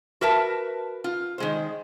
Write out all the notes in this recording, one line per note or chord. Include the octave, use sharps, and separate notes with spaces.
F#4 A#4 B4 E5 A5
F4
D#3 G#3 C5